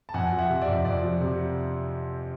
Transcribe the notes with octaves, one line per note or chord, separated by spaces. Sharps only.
A5
F2 F#5 G#5
F3
E5 F#5
C3
D5 E5
F2
F2 D5
F3
C3